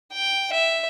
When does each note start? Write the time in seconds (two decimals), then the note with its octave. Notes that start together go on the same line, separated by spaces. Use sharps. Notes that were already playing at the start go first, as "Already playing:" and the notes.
0.13 G5
0.53 E5